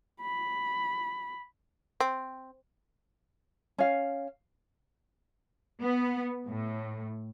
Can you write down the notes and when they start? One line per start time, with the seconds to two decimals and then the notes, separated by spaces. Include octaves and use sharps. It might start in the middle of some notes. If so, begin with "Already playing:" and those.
0.21 B5
2.00 C4
3.78 C#4 F5
5.82 B3
6.47 A2